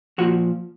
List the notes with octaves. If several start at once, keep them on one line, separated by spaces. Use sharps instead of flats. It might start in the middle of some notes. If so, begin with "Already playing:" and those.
A#2 F3 F#4